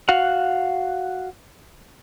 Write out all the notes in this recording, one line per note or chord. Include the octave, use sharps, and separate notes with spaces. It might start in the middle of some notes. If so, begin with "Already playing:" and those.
F#4 F5 F#5